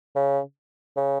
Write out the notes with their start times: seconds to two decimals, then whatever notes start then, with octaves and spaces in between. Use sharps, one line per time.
0.16 C#3
0.96 C#3